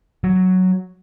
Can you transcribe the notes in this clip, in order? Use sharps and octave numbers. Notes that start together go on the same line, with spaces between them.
F#3